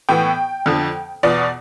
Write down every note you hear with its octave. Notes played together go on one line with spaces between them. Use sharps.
A2 E3 B3 G5
F2 D3 F3
E2 B2 B3 F4 D5